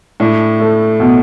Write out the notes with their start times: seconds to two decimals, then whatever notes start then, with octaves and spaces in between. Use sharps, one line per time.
0.20 A2 D4
0.60 A3
1.00 B2